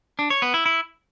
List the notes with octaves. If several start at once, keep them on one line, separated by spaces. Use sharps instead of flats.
D4
C#5
B3
E4
E4